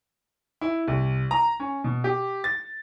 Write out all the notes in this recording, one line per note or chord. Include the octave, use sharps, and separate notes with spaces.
E4
C2
A#5
C#4
B2
G4
A6